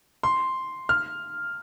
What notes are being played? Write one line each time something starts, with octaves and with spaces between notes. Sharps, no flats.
C6
F6